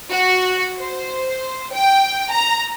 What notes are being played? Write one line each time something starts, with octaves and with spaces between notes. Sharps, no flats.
F#4
C5
G5
A#5